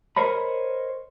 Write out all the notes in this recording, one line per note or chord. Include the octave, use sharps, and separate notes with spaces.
A#4 C5 C#5 D#5 B5